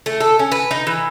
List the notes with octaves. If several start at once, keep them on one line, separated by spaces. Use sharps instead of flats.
A3
A4
C#4
B4
D#4
E3